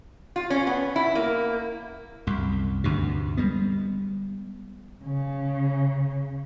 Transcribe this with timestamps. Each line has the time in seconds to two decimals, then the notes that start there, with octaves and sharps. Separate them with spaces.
0.36 F4
0.50 C#4
0.67 B3
0.96 E4
1.15 A#3
2.27 C2 F#2
2.84 D2 G2 C3
3.37 G3 G#3 B3
5.03 C#3